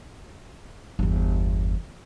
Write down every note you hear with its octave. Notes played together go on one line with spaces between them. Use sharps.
G1 E2